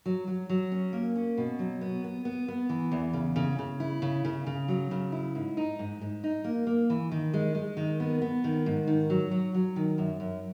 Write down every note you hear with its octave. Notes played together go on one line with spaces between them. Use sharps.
F#3
F#3
F#3
C#4
A#3
C#4
B2
F#3
B3
B3
B3
B3
E3
E2
C#3
C#3
C#3
E4
C#3
C#3
C#3
F#3
C#3
E4
G#2
D#4
G#2
G#2
D#4
A#3
A#3
E3
D#3
G#3
G#3
D#3
B3
B3
D#3
G#2
D#3
F#3
F#3
F#3
D#3
F#2
F#2